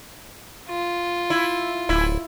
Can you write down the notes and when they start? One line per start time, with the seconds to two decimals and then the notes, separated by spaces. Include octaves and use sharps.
0.69 F4
1.30 E4
1.89 D1 E4